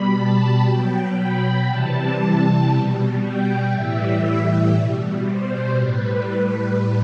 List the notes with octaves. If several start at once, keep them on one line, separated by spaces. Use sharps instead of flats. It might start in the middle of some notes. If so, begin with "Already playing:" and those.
Already playing: B2 G3 B5
A5
B2 F#3 G5
B5
C3 E3 G3 A5
B2 G3
G5
A2 E3 G3 E5
E5
B2 G3
C5
A2 G3 B4
B4